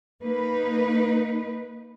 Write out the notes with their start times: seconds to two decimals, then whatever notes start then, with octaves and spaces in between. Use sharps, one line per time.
0.22 A#3 D#4 B4